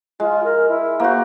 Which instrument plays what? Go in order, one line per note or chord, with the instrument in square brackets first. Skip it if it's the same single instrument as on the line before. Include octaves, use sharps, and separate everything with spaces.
[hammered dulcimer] G#3 [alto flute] F4
[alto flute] A#4
E4
[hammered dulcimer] A#3 F#4 [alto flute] C5